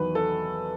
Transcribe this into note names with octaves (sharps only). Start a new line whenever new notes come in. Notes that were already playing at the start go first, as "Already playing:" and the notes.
Already playing: E2 D#3 F#3 B4
A4